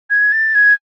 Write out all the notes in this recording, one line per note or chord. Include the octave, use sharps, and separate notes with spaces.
G#6
A6
G#6